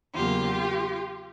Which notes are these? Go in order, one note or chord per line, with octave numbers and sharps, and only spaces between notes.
E2 C#3 F#3 A#3 F4 G4